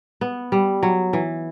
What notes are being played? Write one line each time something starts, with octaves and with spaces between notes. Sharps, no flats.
B3
G3
F#3
E3